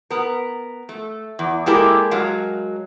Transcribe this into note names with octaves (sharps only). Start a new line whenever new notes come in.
B3 A#4
A3
E2
G#3 A#3 E4 G4 A4 A#4
F#3 G#3 A#4 F5